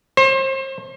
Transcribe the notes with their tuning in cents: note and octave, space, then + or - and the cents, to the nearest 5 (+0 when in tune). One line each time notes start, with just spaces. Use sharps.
C5 +35